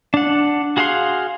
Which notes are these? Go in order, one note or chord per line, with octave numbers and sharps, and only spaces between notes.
D4 F#5
F#4 G#4 F5 F#5 C6